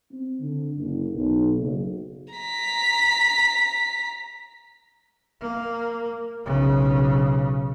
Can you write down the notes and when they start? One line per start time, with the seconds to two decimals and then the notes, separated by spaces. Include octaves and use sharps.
0.11 C4
0.40 D3
0.77 F#1
1.13 B1
1.57 F#1
2.34 A#5 B6
5.41 A#3
6.45 B1 C#3